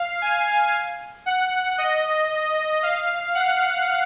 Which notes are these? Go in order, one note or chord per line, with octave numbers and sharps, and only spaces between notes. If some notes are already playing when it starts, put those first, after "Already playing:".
Already playing: F5
G#5
F#5
D#5
F5
F#5